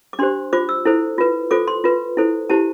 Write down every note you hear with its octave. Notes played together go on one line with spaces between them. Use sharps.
D6
D4 G4 C5 C6
F4 C5 D6
E6
E4 A4 C5
F4 B4
F4 A4 C5 D6
C6
F4 B4
E4 A4 C5
E4 G4 C5 A5